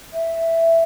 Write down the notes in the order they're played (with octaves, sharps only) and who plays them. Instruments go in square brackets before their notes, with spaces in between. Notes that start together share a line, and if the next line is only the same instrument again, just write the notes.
[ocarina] E5